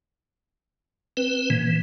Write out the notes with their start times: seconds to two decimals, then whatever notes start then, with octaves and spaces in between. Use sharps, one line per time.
1.17 C4 B4
1.50 A#2 E3